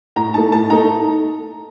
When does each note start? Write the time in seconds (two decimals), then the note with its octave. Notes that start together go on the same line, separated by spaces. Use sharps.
0.16 A2 A#5
0.34 A3 D#4 A5
0.52 A2 A5
0.70 A3 D#4 A#5